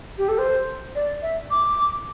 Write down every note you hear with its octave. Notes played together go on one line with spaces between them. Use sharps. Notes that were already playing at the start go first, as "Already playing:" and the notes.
G4
A4
C5
D5
E5
D6